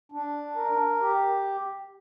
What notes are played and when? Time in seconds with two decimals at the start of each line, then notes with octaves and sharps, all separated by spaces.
0.12 D4
0.56 A#4
1.00 G4